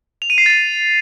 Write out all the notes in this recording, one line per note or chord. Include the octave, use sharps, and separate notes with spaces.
F7
D#7
C7
A6